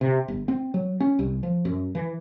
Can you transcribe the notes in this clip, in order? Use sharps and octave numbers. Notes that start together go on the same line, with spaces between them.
C3
G1
C4
F#3
C#4
C2
F3
F#2
E3